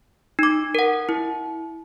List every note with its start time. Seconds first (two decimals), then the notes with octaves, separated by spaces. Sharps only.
0.39 D#4 D6
0.75 A#4 F#5
1.09 E4